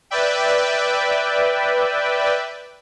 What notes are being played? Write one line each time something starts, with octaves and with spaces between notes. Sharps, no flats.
B4 D5 E5 G5